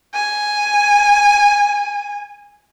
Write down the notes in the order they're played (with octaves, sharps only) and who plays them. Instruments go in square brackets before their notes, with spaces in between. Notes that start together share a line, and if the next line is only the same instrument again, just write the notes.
[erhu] G#5